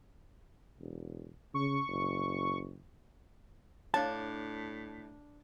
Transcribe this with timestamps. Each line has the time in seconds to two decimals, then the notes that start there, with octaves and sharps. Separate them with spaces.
0.80 E1
1.54 C#3 C#6
1.88 F#1
3.94 A2 D4 C#5 F5 A5